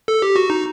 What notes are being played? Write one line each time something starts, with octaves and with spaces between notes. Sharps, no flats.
A4
G4
F#4
D#4